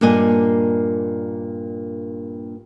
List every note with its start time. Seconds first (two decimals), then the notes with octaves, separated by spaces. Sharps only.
0.01 G2 A#2 A#3 D5 D#5 G#5